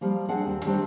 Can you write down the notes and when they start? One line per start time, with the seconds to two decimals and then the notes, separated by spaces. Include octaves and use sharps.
0.01 F3 G3 A#3
0.28 C4 D4 G#4 D5 F#5
0.45 D#2 C4
0.65 D#3 G3 A3 C4 D4 C5